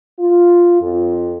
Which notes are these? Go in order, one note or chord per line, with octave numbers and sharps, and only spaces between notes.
F4
F2